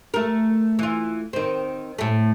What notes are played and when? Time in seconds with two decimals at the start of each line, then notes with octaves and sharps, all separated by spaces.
0.14 A3 A#4
0.79 E3 F4
1.33 D#3 C4
1.98 A2 A3